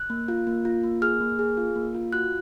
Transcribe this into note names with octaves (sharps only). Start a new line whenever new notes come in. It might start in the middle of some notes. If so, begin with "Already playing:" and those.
Already playing: F#6
A#3
F4
A#3
F4
A#3
G#4 F6
A#3
G#4
F4
A#3
F4
F#4 F#6